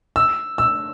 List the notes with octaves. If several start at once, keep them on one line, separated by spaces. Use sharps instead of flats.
E6
E6